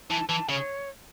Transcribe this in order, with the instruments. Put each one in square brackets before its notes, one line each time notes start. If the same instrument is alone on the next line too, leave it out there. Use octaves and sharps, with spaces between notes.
[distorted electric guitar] E3 [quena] A5
[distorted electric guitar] E3 [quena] A5
[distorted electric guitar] C#3 [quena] C#5